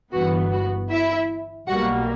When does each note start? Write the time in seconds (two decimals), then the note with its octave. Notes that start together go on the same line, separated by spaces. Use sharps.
0.12 G1 G2 E3 B3 F#4
0.52 F#4
0.90 E4 E5
1.67 B1 B2 G3 A#3 F#4 F#5